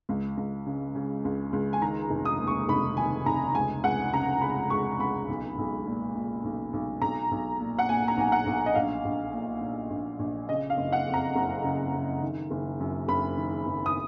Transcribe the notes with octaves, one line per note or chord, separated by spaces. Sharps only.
C#2
C#2
C#3
C#3
C#2
C#2
G#5
D#3 A#5
F1
D#6
D#2
C#6
F1 B5
D#3 G#5
F1 A#5
C#2 G#5
C#2 F#5
C#3 A#5
C#3 B5
C#2 C#6
C#2 B5
B1
B1
A#2
A#2
B1
B1
B1 A#5
B1
A#2
F#5
A#2 G#5
A#5
B1 G#5
F#5
B1
D#5
A#1 F5
A#1
A#2
A#2
A#1
A#1
C#3 D#5
F5
F#1
F#5
F2
A#5
F#1
C#3
F#1
D#3
F#1
F#2
F#1 B5
D#3
F#1
D#6